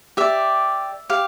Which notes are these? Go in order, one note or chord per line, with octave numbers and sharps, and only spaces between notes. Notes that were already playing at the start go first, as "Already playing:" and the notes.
G4 D5 E5
G4 F5